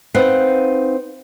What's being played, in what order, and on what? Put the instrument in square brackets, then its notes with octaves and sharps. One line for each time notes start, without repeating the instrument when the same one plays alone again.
[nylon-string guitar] C4 D#4 B4 F5 F#5